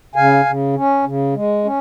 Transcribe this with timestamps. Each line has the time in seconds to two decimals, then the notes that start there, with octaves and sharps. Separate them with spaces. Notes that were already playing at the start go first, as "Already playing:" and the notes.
0.15 C#3 F5 G#5
0.45 C#3
0.75 C#4
1.05 C#3
1.34 G#3
1.64 C#4